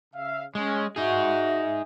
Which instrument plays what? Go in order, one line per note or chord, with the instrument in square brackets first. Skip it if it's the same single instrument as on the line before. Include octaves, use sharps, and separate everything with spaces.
[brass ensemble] C#3 E5 F5
[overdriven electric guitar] G#3 [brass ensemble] C#4
[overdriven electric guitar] D#4 G#4 [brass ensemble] F#4 [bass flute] E5